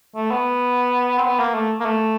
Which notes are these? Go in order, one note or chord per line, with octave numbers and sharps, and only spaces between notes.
A3
B3
C4
B3
A#3
A3
A#3
A3